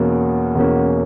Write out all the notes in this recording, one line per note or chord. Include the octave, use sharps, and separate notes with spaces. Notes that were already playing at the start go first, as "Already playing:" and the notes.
Already playing: E2 B2 A#3 C#4
E2 B2 A#3 C#4